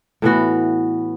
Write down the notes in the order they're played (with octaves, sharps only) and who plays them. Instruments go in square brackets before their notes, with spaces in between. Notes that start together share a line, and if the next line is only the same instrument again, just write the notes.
[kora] A2 E3 B3 F#4